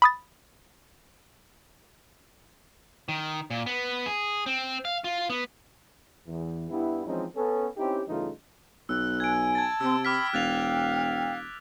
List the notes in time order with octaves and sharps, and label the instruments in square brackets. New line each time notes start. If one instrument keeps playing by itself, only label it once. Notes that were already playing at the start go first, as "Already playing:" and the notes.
[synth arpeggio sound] B5 D#6 A6
[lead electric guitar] D#3
A#2
B3
G#4
C4
F5
F4
B3
[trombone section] E2 E3
G2 G3 B3 E4
E3 F3 G#3 C4 C#4 D#4
B3 C#4 A4
C4 C#4 D#4 E4 G4
G2 C#3 E3 A3 D#4 F4
[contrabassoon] B1 [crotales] E6 [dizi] F#6
[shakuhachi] G#5 [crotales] G#6 D7
[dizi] A5 [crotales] G#6 A6
[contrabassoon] C3 [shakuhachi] C4 [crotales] E6
[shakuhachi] G5 [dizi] B5 [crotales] D6 F6 B6
[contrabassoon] E1 [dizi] F5 [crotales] F#6 A6 F7